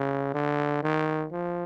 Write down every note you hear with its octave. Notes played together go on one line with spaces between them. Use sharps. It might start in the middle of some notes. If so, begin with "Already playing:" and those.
Already playing: C#3
D3
D#3
F3